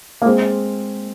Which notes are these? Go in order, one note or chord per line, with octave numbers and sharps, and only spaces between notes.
A#3
G#3 C4